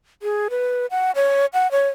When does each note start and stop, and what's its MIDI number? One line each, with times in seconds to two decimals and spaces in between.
0.22 0.48 68
0.50 0.86 71
0.91 1.11 78
1.15 1.46 73
1.53 1.70 78
1.71 1.88 73